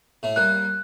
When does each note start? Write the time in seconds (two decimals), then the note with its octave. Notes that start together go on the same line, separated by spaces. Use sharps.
0.23 A2 A3
0.36 G3 A#3 F#6